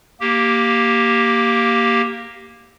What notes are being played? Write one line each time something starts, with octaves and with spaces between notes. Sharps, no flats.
A#3 G4